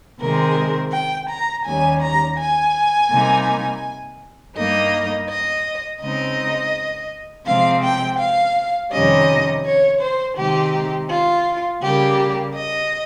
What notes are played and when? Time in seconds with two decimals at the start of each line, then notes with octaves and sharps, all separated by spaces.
0.20 C3 D#3 G#3 C4 A#4
0.92 G5
1.29 A#5
1.65 D#2 D#3 G3 C#4 G#5
2.01 A#5
2.38 G#5
3.11 C3 G3 A#3 D#4
4.56 G2 G3 A#3 D#4 D#5
5.29 D#5
6.01 C#3 G#3 C4 D#4 D#5
7.46 C3 F3 G#3 C4 F5
7.83 G5
8.19 F5
8.91 F2 C3 D#3 G3 C#4 D#5
9.65 C#5
10.01 C5
10.37 C3 D#3 G#3 C4 D#4 G4
11.10 F4
11.81 C#3 G3 A#3 G4
12.54 D#5